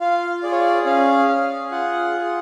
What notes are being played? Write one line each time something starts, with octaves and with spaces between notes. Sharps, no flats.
F4 F5
G#4 D5
C#5
D5
C#4 F5
G#4
F4 F#5
G#4